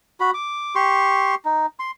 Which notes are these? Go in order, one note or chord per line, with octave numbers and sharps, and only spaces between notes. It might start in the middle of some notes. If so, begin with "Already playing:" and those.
F#4 B5
D6
G4 C6 C#6
D#4
C6